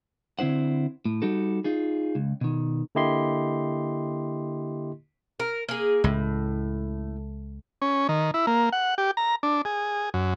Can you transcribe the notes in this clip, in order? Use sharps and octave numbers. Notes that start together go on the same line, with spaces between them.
D3 C4 E4 C5 F#5
A2
G3 D#4 F#4 A4
D#4 F4 G#4
C#2
B2 D#3
D3 A#3 E4 G4 D#5 C6
A#4
A#3 G#4
C#2 A2
C#4
D#3
E4
A#3
F#5
G4
A#5
D4
G#4
F#2